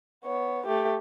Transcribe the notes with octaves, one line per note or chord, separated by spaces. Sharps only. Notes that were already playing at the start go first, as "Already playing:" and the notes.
B3 C#5
A3 G4